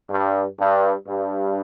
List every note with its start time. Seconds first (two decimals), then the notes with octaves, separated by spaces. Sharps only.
0.10 G2
0.58 G2
1.08 G2